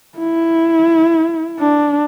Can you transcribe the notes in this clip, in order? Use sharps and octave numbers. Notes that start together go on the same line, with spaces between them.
E4
D4